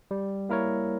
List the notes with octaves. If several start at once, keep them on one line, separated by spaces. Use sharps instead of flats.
G3
A#3 E4 A#4 C#5